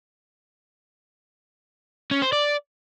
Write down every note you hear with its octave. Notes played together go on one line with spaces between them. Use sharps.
C#4
C5
D5